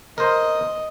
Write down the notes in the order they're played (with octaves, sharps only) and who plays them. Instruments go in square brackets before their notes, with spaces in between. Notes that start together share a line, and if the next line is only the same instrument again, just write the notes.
[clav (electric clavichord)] A#4 C5 [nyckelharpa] D#5